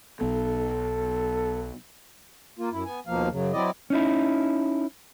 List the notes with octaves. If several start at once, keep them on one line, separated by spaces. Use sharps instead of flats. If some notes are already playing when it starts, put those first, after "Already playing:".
B1 B3 A4
A#3 F4
F#2 E4
B3 G#5
D#2 B2 F3 A#3 F5
F#2 C#3 F#3
F#3 C4 E4 D5 D#5
C#4 D#4 E4